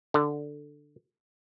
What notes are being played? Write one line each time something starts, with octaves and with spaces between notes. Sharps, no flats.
D3